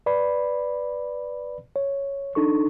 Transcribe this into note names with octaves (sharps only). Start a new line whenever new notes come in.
B4 D5 B5
C#5
D4 D#4 A4 C#6